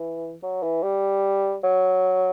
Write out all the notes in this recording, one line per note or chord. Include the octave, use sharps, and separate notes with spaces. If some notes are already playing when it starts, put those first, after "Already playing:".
Already playing: E3
F#3
E3
G3
F#3